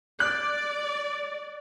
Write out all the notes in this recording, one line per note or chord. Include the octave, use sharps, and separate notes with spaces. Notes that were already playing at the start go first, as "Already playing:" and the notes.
D5 F#6